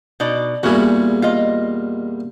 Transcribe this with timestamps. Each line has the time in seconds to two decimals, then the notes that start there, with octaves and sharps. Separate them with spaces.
0.20 B2 D#4 D5
0.63 E2 A#2 G3 F#4 G#4
1.22 F4 D#5